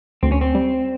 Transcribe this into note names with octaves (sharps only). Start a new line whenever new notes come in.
D2 C4
C#4
C4
G3